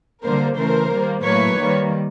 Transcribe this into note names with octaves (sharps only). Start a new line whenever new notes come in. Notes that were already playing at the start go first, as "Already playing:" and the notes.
D3 G3 A#3 A#4 C5
C#3 E3 A3 A#4 C5
D#3 G3 A#3
A2 F#3 A#3 B4 C#5
D#3 G3 A#3